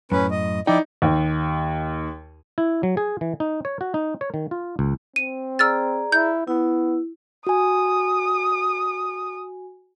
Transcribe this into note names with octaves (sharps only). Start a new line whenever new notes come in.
F#2 A2 C#4 B4
D#5
F3 D#4 E4 D5 G5
D#2
E4
F#3
G#4
E3
D#4
C#5
F#4
D#4
C#5
D#3
F4
C#2
C4 D#7
G#4 D5 A#5 E6 F6 A6
E4 G6
B3 E4
F#4 G#5 D#6